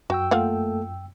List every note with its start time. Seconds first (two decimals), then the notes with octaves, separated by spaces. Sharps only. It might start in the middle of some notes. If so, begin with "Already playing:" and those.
0.10 F#2 F#4 G5 E6
0.31 A3 A#3 F4 A4 F5 F#5